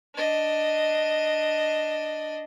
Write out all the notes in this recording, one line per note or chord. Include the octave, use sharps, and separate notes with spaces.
D4 D#5